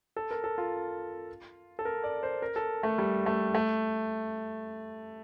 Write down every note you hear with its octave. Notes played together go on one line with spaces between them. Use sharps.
A4
A#4
A4
F4
A4
A#4
D5
C5
A#4
A4
A3
G3
A3
A3